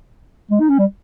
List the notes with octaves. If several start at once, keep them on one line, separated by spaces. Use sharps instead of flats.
G#3
D#4
C#4
G3